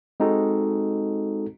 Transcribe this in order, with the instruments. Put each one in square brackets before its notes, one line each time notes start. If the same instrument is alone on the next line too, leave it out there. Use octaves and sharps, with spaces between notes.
[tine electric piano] G#3 C4 D#4 F#4 A4